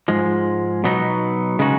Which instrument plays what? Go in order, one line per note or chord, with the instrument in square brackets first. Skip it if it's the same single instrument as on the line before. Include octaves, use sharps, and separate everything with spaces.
[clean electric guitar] G#2 F3 G#3
B2 F#3 B3 D#4
C#3 G#3 D#4 F#4